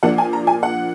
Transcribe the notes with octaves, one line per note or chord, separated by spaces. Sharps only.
A#2 F3 A#3 D4 F#5
G#5
A#5
G#5
F#5